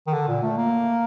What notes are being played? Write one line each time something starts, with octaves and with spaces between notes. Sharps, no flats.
D#3
D3
A#2
A3
A#3